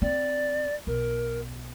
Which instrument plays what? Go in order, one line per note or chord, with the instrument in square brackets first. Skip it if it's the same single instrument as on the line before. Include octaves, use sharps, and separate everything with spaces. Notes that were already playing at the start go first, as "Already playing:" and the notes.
[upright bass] C4 [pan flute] D5
[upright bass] B1 [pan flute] A#4